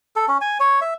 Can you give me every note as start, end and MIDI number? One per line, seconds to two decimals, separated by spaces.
0.16 0.26 69
0.28 0.38 61
0.41 0.58 80
0.60 0.80 73
0.81 0.94 76